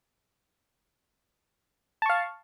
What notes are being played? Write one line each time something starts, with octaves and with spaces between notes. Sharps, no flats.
F5 A5 C#6